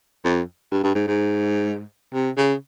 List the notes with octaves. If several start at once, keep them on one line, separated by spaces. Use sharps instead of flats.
F2
G2
G2
G#2
G#2
C3
C#3